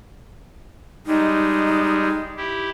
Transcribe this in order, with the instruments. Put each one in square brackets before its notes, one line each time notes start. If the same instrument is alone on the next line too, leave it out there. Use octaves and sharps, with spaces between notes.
[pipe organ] G3 G#3 [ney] D#4
[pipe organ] E4 G4